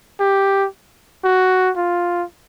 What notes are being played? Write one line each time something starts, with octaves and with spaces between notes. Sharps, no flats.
G4
F#4
F4